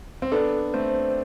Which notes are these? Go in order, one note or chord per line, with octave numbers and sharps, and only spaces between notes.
C4
B3 D4 A4
A3 C4 C5